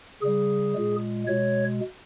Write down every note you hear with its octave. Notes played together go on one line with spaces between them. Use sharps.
C#3 G3 G#4
A#2 G#3
B2 G#3 C#5